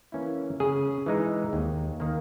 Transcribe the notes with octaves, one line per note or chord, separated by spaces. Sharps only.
E3 A#3 C#4 E4
C#3 G#4
E3 G#3 D#4
D#2
D#3 A#3